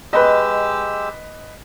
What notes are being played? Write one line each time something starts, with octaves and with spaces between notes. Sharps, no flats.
G#3 G4 B4 D#5 E6